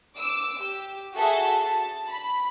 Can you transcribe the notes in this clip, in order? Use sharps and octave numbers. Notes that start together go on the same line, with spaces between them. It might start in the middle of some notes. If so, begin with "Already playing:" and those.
D6 E6
G4
F#4 G#4 A4 E5
A5
B5